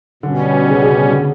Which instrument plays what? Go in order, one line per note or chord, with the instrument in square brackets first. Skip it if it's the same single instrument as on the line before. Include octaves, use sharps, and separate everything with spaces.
[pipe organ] B2 G3 C#4 [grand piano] D3
[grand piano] C#3
D3
C#3
D3